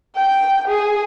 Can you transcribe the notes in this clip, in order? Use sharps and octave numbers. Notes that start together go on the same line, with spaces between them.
G5
G#4